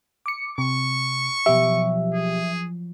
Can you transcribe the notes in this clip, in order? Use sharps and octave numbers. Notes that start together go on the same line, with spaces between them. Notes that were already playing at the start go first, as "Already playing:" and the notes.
D6 C#7
C3 C#6
B2 F3 F#3 G4 E5
G#4